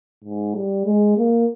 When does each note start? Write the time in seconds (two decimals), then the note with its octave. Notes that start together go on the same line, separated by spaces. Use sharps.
0.24 G#2
0.56 G3
0.86 G#3
1.18 A#3